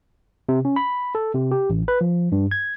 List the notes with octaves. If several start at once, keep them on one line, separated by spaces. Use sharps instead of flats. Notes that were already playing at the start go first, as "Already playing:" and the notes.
C3
C#4
B5
A4
C3
G4
A1
B4
F3
G2
G#6